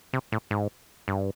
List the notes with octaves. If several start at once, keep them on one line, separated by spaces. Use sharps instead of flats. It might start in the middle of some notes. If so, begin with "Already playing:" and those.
C3
A2
G#2
G2